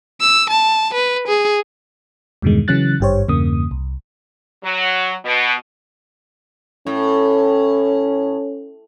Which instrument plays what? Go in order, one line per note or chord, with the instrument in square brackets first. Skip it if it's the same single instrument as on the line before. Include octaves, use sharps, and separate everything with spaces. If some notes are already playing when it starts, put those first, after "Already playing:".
[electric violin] E6
A5
B4
G#4
[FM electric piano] E2 G2 B2 D3 D#3 G#3
C#3 E3 F#3 C#4 F#6 A6
G#1 G2 G4 C5 C#5
E2 G2 C#3 A#3 D#6
C2
[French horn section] F#3
B2
[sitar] A2 [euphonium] C#4